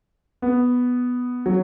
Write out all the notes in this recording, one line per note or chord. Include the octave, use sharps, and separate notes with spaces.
B3
F#3